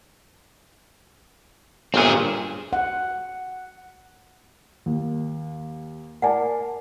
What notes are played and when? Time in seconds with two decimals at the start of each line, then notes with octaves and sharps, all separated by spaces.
1.94 G1 A#2 C4 G#4
2.73 F#5
4.86 D#2
6.22 A#4 D5 F#5 G#5 A5